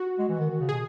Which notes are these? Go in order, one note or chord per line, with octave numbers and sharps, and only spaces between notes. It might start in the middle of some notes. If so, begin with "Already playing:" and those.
Already playing: F#4
G#3
E3
D#3
D#3
C#3
B2 G#4